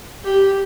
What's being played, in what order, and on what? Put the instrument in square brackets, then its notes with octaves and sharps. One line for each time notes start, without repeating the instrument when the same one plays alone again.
[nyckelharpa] G4